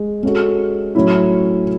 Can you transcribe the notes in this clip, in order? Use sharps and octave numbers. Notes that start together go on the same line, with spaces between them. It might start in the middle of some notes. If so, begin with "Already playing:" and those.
Already playing: G#3
G#3 C#4 F#4 A4
A2 F#3 C#4 E4